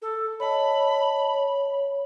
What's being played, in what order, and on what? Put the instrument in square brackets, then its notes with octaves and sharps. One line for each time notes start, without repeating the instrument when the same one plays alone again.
[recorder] A4
[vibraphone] C#5 D#5 A5 [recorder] B5
[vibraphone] C#5